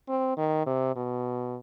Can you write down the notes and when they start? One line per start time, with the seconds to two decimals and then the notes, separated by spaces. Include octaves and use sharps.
0.08 C4
0.37 D#3
0.66 C3
0.96 B2